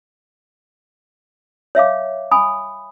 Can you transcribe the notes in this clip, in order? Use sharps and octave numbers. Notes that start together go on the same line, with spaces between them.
C#5 E5 F5 D6
G#5 B5 D#6